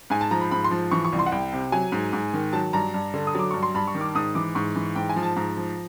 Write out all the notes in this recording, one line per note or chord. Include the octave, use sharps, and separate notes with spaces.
G#2 G#5
A5
F3 A#5
B5
G#2 B5
C6
F3
E3 C#6
C#6
C2
C6
F#5
C2 G5
C3
F#3 G#5
G#2
G#2
D#3
F#3 A5
G2 A#5
G2
D3
D#6
F#3 D6
G2 C#6
C6
G2 B5
C#6
D#3
D6
G#2 D#6
E3 D6
G#2 C#6
E3
G#2 G5
G#5
F3
A5
G#2 A#5
F3